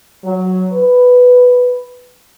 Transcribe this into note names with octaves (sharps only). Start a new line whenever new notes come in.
F#3
B4